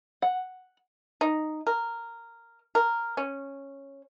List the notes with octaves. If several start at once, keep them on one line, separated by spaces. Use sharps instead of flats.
F#5
D#4
A#4
A#4
C#4